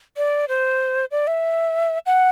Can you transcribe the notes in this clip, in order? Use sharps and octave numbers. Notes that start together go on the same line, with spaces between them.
D5
C5
D5
E5
F#5